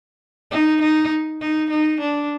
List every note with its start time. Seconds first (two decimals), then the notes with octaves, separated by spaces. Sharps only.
0.51 D#4
0.82 D#4
1.41 D#4
1.70 D#4
2.00 D4